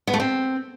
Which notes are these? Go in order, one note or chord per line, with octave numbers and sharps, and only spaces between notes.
B3
A3
C4